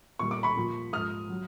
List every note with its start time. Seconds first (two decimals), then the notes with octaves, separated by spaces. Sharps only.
0.19 A#2 G3 C#6
0.31 D6
0.43 B5 C#6
0.56 A#2 F3
0.92 G#2 F3 D#6 F6
1.29 F#3